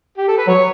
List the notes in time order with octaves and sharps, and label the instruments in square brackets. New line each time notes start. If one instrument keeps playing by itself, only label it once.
[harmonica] G4
A4
B4
[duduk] F#3 [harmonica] C#5